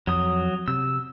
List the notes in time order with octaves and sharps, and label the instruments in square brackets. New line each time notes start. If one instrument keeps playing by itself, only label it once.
[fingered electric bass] F2 [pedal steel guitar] F#3 D#6
[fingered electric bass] C3 [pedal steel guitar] E6